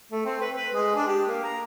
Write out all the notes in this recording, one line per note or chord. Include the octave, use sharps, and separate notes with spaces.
A3
C4
B4
B4
G#3
D4
G4
A#3
A#5